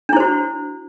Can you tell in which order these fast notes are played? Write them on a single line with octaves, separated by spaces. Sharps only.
D4 E4 C5 F#4